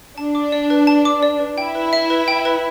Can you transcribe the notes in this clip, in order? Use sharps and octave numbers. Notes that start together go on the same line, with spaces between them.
D4 A5
D6
D5
B4
A5
D6
D5
B4
E4 G5
B4
E5
B4
G5
B4